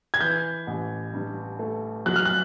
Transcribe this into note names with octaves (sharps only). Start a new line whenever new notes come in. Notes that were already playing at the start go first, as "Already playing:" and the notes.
G#6
E3 G6
A1
G2
A3
F#3 F#6
F6
F#6